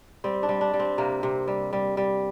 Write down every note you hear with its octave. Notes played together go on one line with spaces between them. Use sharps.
G3 C4
D4
G3
D4
G3
C4
C3 A#3
C3
G3
G3
G3